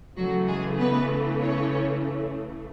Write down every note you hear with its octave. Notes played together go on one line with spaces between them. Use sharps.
C#3 E3 F#3 A3 F#4
G#3 G#4
B3 B4
C#4 C#5